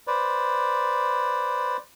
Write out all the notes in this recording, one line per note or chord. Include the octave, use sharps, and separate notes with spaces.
B4 C5 D5